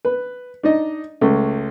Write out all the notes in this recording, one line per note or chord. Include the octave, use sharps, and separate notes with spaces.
B4
D4 D#4 D#5
C#2 A3